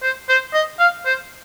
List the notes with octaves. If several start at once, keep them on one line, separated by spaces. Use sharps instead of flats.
C5
C5
D#5
F5
C5